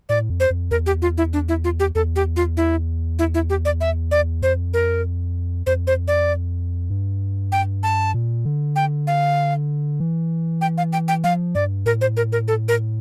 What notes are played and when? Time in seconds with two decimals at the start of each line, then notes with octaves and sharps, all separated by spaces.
0.09 A2 D5
0.30 F2
0.40 C5
0.50 F2
0.71 E2 A#4
0.86 G4
1.02 F4
1.18 E4
1.33 D4
1.49 E4
1.64 F4
1.80 G4
1.95 E2 A4
2.16 G4
2.36 F4
2.57 E4
3.19 E4
3.34 E4
3.50 G4
3.65 D5
3.81 E5
4.11 D5
4.42 F2 C5
4.74 A#4
5.67 F2 C5
5.87 C5
6.08 D5
6.90 G2
7.52 G5
7.83 A5
8.14 A#2
8.45 D3
8.76 G5
9.07 F5
10.00 E3
10.61 G5
10.78 F5
10.93 G5
11.08 G5
11.24 F3 F5
11.55 G2 D5
11.86 A2 A#4
12.01 C5
12.17 A#4
12.32 A#4
12.48 A4
12.68 A#4